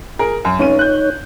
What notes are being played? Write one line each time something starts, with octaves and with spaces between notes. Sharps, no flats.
G#4 A#4
F#2
F1 C#4 D#4 C#5 D#7
F#6 G6